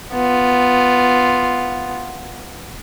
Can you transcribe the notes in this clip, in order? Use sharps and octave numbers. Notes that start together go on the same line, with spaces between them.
B3 F4